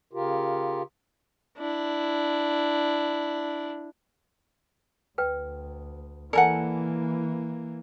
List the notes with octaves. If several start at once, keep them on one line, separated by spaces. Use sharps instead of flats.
C#3 F4 G4 A#4
D4 E4
D2 B4 G5
E3 A#3 A4 A#4 D5 F#5 G#5 A5